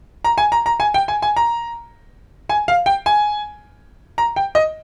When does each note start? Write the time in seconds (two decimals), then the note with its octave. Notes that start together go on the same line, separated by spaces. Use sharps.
0.24 A#5
0.38 G#5
0.52 A#5
0.66 A#5
0.80 G#5
0.94 G5
1.08 G#5
1.22 G#5
1.37 A#5
2.49 G#5
2.68 F5
2.86 G5
3.06 G#5
4.18 A#5
4.36 G5
4.55 D#5